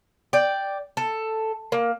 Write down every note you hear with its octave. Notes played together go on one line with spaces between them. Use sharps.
D5 G5
A4
A#3